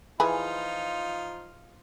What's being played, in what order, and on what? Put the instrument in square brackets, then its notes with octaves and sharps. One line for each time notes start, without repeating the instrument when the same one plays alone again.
[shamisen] E3 G#4 B5 [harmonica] F3 D#4 F4